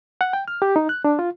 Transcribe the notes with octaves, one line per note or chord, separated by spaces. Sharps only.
F#5
G5
F6
G4
D#4
F#6
D4
F4